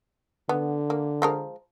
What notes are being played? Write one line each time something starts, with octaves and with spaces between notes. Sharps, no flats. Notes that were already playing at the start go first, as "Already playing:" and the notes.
D3 B3
A#3
F3 G#3 A#4